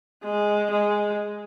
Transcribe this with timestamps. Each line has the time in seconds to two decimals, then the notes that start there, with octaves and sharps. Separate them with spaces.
0.24 G#3
0.71 G#3